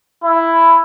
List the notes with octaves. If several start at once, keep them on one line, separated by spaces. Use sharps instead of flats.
E4